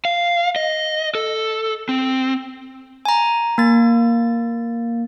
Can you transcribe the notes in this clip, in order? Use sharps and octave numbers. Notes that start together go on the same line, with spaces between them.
F5
D#5
A4
C4
G#5 A#5
A#3 A6